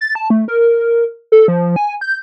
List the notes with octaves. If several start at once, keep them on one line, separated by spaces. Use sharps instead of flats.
A6
A5
A3
A#4
A4
F3
G#5
G6